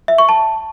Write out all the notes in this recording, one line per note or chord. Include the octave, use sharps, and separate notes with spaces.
E5
C#6
A5